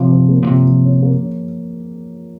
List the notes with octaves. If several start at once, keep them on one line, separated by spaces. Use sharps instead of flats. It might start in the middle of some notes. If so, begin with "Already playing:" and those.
Already playing: C3 F3 C#4
F3
A#3
A#2
C3 F3
F3
C#4
A#3
C#4